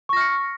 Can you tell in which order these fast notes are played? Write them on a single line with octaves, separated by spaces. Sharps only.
C#6 A#6 F6 C#7